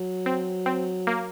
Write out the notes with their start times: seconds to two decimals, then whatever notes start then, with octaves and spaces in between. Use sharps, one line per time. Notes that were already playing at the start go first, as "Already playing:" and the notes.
Already playing: F#3
0.26 C4
0.66 C4
1.07 A#3